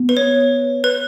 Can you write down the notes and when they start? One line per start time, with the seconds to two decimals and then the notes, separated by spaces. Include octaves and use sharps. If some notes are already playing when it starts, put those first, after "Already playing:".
Already playing: B3
0.09 B4
0.17 C#5
0.84 B4